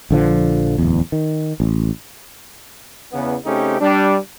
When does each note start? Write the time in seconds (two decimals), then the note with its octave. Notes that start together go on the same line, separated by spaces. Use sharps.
0.11 A#1 D3 F3
0.78 D1 E2
1.12 D#3
1.60 A1
3.12 E2 C#3 B3
3.45 C#3 A3 C4 C#4 D#4 G4
3.80 G3 D4